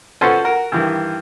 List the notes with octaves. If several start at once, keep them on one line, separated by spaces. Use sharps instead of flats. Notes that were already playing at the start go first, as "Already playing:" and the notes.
C#4 F4 F#4 A4 B4 C5
F#4 A#4
G2 D#3 E3